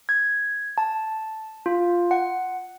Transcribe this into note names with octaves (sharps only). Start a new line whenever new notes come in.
G#6
A5
F4
F#5